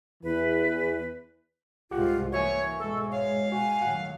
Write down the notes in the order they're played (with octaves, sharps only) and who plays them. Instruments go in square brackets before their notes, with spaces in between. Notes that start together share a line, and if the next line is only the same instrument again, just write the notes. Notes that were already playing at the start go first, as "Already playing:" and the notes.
[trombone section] E2 E3 [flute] B4
[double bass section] C2 G#2 [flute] F4 [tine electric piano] G4 F#5
[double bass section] E3 A#3 [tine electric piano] F#4 E5 G#5 [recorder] C#5 [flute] C#6
[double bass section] G#2 B2 G#3 [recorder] A4
[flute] C#5 [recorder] F5
[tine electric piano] F#4 [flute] G#5
[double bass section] D#2 A2 F#3 [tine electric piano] F#5